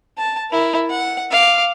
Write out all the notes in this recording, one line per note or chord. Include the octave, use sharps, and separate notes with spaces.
A5
E4 A#4
F#5
F5 D6